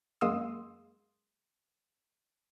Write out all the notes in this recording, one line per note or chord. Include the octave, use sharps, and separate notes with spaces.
F#2 G#3 A#3 C6 D#6 E6